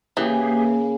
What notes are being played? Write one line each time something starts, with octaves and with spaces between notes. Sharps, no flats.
C#3 E3 A#3 G4 G#4